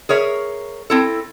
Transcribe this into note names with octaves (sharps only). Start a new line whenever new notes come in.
G#4 A#4 C#5 E5
C4 E4 A4